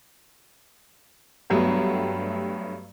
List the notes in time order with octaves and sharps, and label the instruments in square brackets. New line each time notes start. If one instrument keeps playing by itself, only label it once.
[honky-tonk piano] G2 F#3 G3 A3 B3